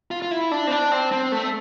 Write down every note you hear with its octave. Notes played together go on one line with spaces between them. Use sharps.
F4
F4
E4
D4
C4
D4
C4
C4
A3